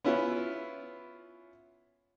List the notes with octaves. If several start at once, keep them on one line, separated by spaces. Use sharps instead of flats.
B3 C#4 E4 F4